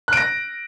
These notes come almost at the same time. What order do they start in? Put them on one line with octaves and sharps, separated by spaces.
F#6 D7 A#6